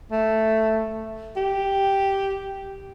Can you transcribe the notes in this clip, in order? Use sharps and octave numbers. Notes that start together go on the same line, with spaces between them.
A3
G4